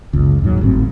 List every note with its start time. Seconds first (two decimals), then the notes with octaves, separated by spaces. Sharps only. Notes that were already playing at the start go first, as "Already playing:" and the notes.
0.13 F#1 C#2
0.42 D#2 G#2 F#3
0.61 G1 A2 C4